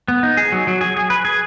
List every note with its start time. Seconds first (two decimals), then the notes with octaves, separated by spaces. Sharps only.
0.08 B3
0.23 D#4
0.37 G#4
0.52 F#3
0.67 F#3
0.81 G#4
0.97 G#4
1.10 B4
1.25 G#4